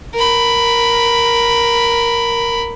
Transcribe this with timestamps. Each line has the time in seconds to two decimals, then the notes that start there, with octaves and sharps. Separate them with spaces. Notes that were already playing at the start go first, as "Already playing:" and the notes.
0.14 A#4 B5